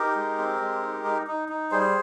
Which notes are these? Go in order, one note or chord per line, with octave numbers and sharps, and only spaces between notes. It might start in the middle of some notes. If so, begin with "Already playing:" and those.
Already playing: D#4 G4 A#4
G#3
C4
G#3
D#4
D#4
D#4
D#4
G3 G#4 C5